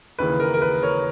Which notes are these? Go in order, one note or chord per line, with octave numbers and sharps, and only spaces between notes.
D#2 C#3 E3 B4
A#4
A#4
B4
A#4 C#5